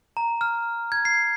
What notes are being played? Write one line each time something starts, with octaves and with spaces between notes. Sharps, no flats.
A#5
F6
G#6
C7